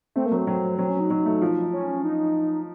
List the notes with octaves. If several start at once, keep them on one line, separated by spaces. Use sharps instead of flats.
A3 C4
A#3
F#3 C4
F#3 C4
F#3 C4
C#4
D#4
F#3
A3
F3
C#4
D#4